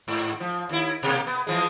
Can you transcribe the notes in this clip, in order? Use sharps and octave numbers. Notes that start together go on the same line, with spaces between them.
G#2
F3
D#2 E4
B2 A#3
B3
E3 F3 G#3